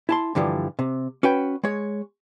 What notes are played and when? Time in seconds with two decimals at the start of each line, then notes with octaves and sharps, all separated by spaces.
0.09 E4 A5 C6
0.35 G2 D3 E3 F3 G3
0.79 C3
1.23 C#4 F#4 B4 G5
1.64 G#3 C#5